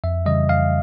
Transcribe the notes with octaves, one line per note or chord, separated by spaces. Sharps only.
F2 E5
C#3 E3 G3 D#5
F2 F5